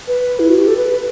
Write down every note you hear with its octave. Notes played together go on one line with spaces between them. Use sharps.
B4
E4
F#4
G4
A4
B4